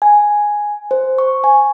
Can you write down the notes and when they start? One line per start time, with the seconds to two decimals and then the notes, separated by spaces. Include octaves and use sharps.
0.02 G#5
0.91 C5
1.18 C#6
1.44 G#5